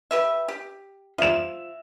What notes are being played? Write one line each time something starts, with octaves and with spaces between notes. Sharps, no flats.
G4 B4 E5
G4
F3 E5 E7